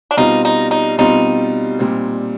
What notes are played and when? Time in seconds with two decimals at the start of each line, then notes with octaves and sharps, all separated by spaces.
0.11 D4
0.17 B2 G3 C4 D#4 F4
0.45 D#4
0.71 D#4
0.98 B2 G3 C4 D#4 F4
1.79 A#2 G3 C4